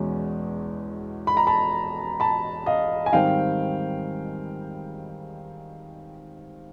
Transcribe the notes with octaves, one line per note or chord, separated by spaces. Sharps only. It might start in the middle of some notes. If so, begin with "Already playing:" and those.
Already playing: E2 B2 G#3 C#4
B5
A#5
A5 B5
A5 B5
D#5 F5
G#5
G#2 D#3 G3 C4 F5 G5